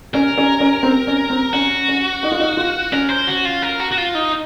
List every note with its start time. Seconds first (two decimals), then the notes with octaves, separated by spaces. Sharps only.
0.14 C#4 A#4
0.38 C#4
0.60 C#4
0.83 C4
1.07 C#4
1.30 C4
1.53 C#4 F#4
1.88 C#4
2.23 D#4
2.32 F4
2.40 D#4
2.57 F4
2.92 C#4 A#4
3.10 C5
3.28 F#4
3.45 F4
3.62 A#4
3.80 F#4
3.92 F#4
3.98 F4
4.15 D#4